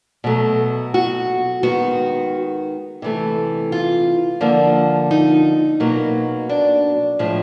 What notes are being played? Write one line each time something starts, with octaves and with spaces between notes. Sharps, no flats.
B2 F#3 A3
F#4
D#3 G#3 B3 F#4
C3 E3 A3
F4
D3 F3 A#3
D#4
B2 F#3 A#3
D4
A2 F3 G#3